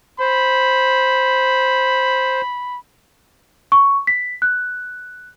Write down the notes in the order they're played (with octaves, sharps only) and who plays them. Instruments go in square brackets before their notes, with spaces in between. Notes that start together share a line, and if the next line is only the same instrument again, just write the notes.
[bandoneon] C5 [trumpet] B5
[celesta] C#6
B6
F#6